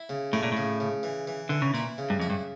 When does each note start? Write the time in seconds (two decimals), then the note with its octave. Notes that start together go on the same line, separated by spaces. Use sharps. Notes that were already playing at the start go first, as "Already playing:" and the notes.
Already playing: E4
0.09 C#3
0.33 A2 A3
0.43 A#2
0.52 A2 C#3
0.80 C#3
1.03 E3
1.27 E3
1.49 D3 E3
1.62 C#3
1.74 A#2 E4
1.98 C#3
2.10 G2
2.19 F2 E4
2.30 G2